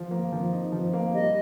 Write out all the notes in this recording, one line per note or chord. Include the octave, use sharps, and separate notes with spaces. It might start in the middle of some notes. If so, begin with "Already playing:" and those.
Already playing: F3
A#3
F3
D#4
F3
A#3
G3 D#5